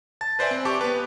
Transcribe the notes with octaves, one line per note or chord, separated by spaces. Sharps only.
A5 A6
B4 C5 D5 E5 G#5
C4
G4 A5 C#6 D6
B3 B4